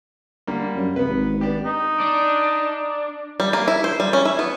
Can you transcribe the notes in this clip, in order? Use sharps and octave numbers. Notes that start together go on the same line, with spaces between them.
D3 G3 A#3
F#2
C3 B3 B4
G#1
B3 D4 G4
D#4
D4
G3
A#3
E4
C5
G3
C#4
E4
B3